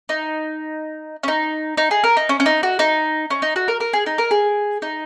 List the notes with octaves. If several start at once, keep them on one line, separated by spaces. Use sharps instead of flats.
D#4
C#4
D#4
D#4
G#4
A#4
D#4
C#4
C#4
D#4
F#4
D#4
C#4
D#4
F#4
A#4
A#4
G#4
D#4
A#4
G#4
D#4